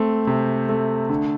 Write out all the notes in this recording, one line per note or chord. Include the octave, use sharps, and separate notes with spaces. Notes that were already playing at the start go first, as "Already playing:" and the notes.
Already playing: A3 C4
C3
A3
D3